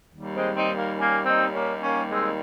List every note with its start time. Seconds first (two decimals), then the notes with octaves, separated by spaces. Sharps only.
0.13 D#2 D#3 G3
0.35 G#3 C4
0.56 C4 D#4
0.76 A#3
0.97 A#3 C#4
1.26 C4 D#4
1.53 A#3 C#4
1.82 A#3 C#4
2.09 G#3 C4